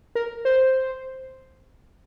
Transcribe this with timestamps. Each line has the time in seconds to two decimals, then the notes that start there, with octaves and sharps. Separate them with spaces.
0.15 A#4
0.45 C5